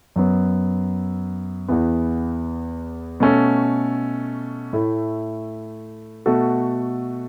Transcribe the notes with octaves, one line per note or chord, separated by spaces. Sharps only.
F#2 F#3 B3
E2 E3 B3
B2 A3 C#4 A4
A2 A3 E4
B2 A3 F#4 A4